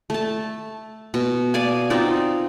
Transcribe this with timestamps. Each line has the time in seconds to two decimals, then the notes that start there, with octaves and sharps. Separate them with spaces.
0.10 A3 A5
1.14 B2
1.54 D5 F5 G#5
1.90 C4 D#4 F4 D5